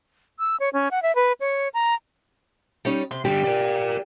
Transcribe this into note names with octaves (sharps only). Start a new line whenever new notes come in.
E6
C#5
C#4
F#5
E5
B4
C#5
A#5
G3 C#4 D#4
C3 C6
D3 G3 G4
A#4 D5